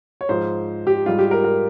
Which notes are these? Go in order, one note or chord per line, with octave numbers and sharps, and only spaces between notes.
C#5
G#2 F3 C5
G4
G#2 G3 F4
G4
A#4
A#4